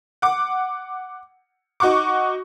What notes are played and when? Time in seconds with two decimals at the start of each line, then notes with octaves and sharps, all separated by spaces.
0.22 F#5 D6
1.80 D#4 F#4 F#5 C#6 D6